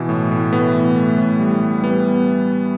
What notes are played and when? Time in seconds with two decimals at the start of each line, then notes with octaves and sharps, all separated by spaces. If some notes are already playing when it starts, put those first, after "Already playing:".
Already playing: B2 E3
0.09 A2
0.31 A2
0.52 A3 B3
0.74 E3
0.96 A3
1.18 A2
1.40 G3
1.61 G3
1.84 G3 B3